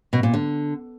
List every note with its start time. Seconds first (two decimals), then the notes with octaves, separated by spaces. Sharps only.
0.13 B2
0.23 A#2
0.34 D3